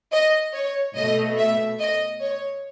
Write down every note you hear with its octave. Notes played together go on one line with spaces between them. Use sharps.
D#5
C#5
B2 A3 D#5
E5
D#5
C#5